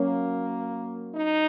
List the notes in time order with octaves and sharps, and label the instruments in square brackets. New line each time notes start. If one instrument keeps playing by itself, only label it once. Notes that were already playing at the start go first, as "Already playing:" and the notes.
Already playing: [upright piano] F#3 C#4 F#4 C#5 [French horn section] A#3
[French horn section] D#4